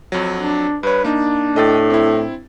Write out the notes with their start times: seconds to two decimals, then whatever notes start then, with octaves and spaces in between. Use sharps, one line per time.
0.12 F2 F#3
0.37 D4
0.83 G2 B4 C#5
1.04 A#3 D4 D#4
1.56 A2 D#5 G5 A6
1.90 C4 E4